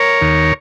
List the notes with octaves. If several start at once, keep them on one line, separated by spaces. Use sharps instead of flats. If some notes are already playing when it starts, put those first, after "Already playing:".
Already playing: A#4 C#5
D#2